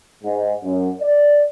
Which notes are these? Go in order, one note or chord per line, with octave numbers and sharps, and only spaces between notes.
G#2
F#2
D5